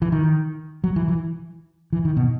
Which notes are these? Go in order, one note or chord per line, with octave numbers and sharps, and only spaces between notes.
E3
D#3
F#3
E3
E3
E3
D#3
B2